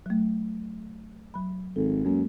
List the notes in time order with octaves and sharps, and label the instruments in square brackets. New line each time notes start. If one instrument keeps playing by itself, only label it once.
[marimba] F#3 A3
F#3 B5
[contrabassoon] G#1 [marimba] A4
[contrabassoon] F#2 [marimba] G#3 A#3